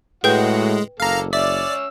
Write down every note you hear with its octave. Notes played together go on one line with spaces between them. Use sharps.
A2 G#3 F#4 B4 F#5 G5 G6
F#1 A#3 A4 F5 A#5
C#4 D5 E5 E6